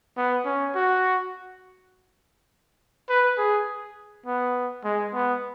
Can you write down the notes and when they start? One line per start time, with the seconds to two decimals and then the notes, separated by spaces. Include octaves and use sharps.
0.17 B3
0.45 C#4
0.75 F#4
3.09 B4
3.38 G#4
4.26 B3
4.84 G#3
5.14 B3